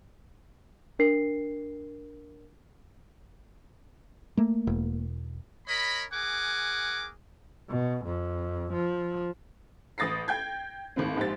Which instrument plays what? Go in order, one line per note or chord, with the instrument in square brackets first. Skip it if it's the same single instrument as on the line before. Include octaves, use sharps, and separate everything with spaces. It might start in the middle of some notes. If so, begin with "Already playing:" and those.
[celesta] D4 A#4 C7
[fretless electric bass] A3 A#3
[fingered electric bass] E1
[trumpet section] A#4 C#5 D#5 B5
G#4 A#4 F#5 G#5 D6
[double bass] B2
F2
F3
[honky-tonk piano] A1 D#6 A6 A#6 C7
G5 G6 G#6
G#1 D#2 A2 C4
A#1 G#2 G4 C5 A6